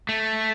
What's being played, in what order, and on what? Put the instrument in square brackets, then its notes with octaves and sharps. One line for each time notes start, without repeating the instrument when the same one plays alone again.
[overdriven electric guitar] A3